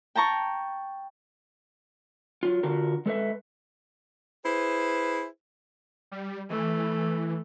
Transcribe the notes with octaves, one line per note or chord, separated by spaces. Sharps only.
G5 A5 A#5 C#6
F#3 F4
D3 F4 F#4 A#4
G#3 A4 B4 E5
E4 G#4 B4 C5
G3
E3 A3